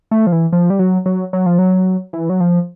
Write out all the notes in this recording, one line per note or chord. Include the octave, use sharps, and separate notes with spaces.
A3
F3
E3
F3
G3
F#3
F#3
F#3
F3
F#3
E3
F#3
F3